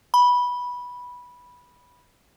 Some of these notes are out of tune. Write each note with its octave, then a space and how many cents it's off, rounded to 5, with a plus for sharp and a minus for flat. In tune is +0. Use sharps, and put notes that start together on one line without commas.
B5 -10